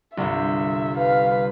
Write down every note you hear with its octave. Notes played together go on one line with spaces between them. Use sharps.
G1 C2 E5
B4 F5